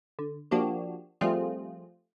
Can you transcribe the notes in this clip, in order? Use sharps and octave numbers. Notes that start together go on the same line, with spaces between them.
D3
F3 A#3 D4 F#4 G4
F3 G3 A3 C4 F4 G#4